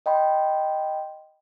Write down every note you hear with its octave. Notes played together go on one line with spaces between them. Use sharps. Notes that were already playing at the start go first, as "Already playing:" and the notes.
D#5 G5 B5 C6